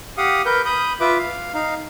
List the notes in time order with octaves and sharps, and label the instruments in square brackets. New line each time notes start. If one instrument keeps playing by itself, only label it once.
[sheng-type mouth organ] G4 F5 F#5 D#6
A#4 B4 G6
B5 D#6 G6
F4 B4 E5 D6
F5
D#4 F5